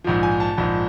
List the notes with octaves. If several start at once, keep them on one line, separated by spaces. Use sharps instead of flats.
A#1 G#2 F3
G#5
A5
A#1 G#2 F3